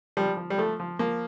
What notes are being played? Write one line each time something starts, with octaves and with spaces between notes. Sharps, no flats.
F3 G3
F3
G3
F3 A3
F3
F3 A#3